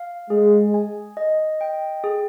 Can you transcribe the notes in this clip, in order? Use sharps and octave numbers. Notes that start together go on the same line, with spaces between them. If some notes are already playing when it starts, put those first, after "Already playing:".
Already playing: F5
G#3 G#4
G#5
D#5
G5
G#4